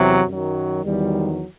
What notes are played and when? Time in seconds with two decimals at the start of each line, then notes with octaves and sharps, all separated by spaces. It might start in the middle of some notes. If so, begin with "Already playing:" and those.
Already playing: E2 C3 F#3
0.26 F#2 D#3 F#3
0.85 E2 D#3 F#3 G3